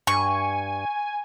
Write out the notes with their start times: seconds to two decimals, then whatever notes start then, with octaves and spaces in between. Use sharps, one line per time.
0.07 G2 G#5 C#6